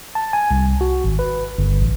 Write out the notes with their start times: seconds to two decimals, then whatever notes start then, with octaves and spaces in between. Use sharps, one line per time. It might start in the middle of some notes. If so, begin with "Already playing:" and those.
0.15 A5
0.33 G#5
0.51 C2
0.81 F#4
1.04 G#1
1.19 B4
1.58 G1
1.81 A1